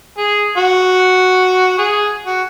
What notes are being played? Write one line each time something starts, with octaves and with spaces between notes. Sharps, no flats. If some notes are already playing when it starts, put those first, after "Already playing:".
G#4
F#4
G#4
F#4